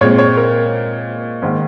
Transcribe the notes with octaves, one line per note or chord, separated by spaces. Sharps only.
A#2 G#3 C4 C#5
C#5
A#4
G#2 D#3 A#3